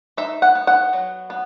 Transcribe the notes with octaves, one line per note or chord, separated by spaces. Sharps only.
D#4 E5
F#5
B3
F#5
F#3
B3